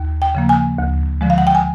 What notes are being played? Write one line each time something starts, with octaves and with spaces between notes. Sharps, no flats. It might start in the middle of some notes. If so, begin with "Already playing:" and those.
Already playing: D#2
G5
C#3 F3 A#3
G#5
D2
D3 F3 G#3
F5
F#5
G5
G#5